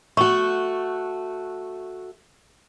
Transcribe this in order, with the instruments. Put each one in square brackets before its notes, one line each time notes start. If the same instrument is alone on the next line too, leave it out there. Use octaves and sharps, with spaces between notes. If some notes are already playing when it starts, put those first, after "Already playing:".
[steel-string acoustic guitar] A3 F#4 [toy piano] C#6